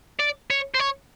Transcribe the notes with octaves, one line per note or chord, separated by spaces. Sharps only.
D5
C#5
C5
C#5